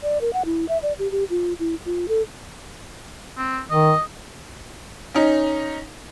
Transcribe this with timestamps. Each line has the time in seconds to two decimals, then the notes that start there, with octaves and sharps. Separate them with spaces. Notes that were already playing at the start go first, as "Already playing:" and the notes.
0.03 D5
0.21 A#4
0.33 F#5
0.45 E4
0.69 E5
0.82 D5
0.99 G4
1.11 G4
1.30 F4
1.59 E4
1.85 F4
2.08 A4
3.38 C4
3.70 D#3 D#5
5.15 C#4 D#4